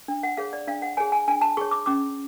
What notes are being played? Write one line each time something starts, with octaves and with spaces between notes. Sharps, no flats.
D4
F#5
G#4 C#5 F5
D5
D4 F5
F#5
G#4 C#5 G#5
G#5
D4 G#5
A5
G#4 C#5 C#6
D6
C#4 D6